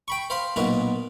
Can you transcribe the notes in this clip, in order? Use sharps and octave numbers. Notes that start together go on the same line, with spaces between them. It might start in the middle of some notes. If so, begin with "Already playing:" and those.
G5 B5 C#6
C5 F5 B5 C6
B1 A#2 F4 F#4 D#5 B5